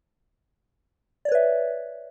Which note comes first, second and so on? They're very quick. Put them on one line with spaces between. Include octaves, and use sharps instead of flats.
D5 C#5 B4 E5